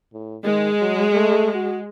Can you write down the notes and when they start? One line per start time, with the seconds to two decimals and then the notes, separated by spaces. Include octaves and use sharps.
0.13 A2
0.45 D#3 G#3
0.81 F#3
1.13 A3
1.55 F#4